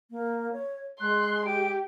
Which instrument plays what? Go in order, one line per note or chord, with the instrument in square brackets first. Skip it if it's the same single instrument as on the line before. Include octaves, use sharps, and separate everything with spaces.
[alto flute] A#3
C#5
[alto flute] G#3 [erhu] C6 [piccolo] F#6
[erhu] G4 [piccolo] D7